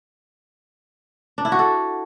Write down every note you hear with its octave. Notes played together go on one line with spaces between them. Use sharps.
D4
E4
F#4
A4